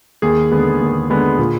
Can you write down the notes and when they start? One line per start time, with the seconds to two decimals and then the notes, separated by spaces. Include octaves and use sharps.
0.22 D#2 G#4
0.52 D3 G#3 B3
0.81 D#2
1.10 D3 G#3 B3
1.39 A#2